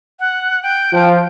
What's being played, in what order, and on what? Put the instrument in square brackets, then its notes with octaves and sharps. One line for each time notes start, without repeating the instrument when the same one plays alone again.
[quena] F#5
G5
[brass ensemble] F3